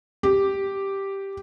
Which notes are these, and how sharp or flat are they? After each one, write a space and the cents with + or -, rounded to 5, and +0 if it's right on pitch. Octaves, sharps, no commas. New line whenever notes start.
G4 -5